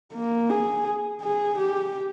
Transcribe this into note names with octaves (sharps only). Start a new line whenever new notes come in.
A#3
G#4
G#4
G4